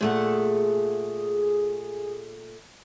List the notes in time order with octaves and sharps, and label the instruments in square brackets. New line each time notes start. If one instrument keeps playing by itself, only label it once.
[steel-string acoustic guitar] A#2 A3 F#5 [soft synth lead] G#4